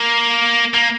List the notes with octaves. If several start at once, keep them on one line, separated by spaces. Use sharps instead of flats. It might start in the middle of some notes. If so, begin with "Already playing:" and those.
Already playing: A#3
A#3